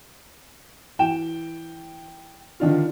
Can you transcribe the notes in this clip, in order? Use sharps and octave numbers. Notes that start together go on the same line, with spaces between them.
E3 G5 E7
D3 D#3 D4 F4